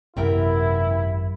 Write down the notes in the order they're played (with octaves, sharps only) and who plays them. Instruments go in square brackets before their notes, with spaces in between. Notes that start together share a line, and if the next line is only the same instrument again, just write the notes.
[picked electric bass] G#1 F#2 [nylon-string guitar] C3 [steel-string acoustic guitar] B3 A#4 G5 [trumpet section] E4